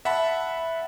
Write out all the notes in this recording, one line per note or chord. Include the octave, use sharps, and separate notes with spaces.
E5 F#5 A5 B5